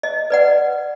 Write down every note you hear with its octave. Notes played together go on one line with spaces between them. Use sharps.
D#5
B4 D5 F#5